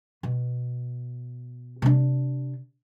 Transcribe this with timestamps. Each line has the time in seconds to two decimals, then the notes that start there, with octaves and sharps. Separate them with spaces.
0.23 B2
1.82 C3 D4